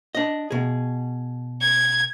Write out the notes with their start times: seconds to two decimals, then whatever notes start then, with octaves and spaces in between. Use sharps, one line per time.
0.15 D4 D#5
0.51 B2 G#4
1.61 G#6